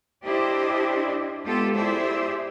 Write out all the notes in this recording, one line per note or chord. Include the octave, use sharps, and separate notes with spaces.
D4 E4 G4 C5 D5 D#5
G#3 B3 F4 G4 A4
E4 G4 G#4 C5 D5 E5